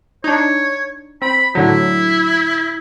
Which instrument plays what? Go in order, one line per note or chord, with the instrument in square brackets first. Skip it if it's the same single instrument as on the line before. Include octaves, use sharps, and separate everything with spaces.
[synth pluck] D4 D#4 [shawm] C#5
[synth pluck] C4 [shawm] B5
[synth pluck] A2 D3 F#3 [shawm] E4